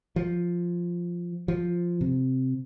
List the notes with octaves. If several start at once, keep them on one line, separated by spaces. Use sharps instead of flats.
F3
F3
C3